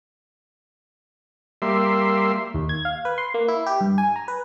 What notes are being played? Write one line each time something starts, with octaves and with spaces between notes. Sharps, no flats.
G3 A#3 E5 C6
D#2
G#6
F5
B4
C6
A#3
E4
G4
G2
G#5
A#5
B4